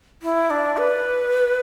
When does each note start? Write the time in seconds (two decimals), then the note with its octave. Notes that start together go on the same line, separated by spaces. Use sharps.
0.22 E4
0.50 D4
0.77 B4